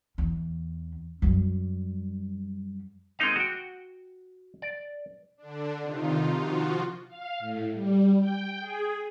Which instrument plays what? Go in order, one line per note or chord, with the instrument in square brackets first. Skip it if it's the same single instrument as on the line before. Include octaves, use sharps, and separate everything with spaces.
[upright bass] E2
F#2 G3
[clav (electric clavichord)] G#3 A#3 C4 D#4 D#5 F5
F#4 G5
D5
[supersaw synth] D3 D4
C3 D#3 D#4 F4
F3 F4 F#4
[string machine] F5
A2
G3
G5
G#4